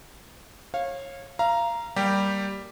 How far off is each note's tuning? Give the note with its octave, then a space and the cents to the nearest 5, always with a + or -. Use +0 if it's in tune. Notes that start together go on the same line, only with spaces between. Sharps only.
C#5 -25 F5 +0
F5 -25 A#5 +5
G3 +0 A#3 +0 G4 +0